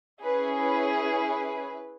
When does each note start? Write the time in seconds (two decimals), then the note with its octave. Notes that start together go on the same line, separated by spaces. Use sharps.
0.22 C#4 E4 G#4 B4
0.60 B4
0.97 B4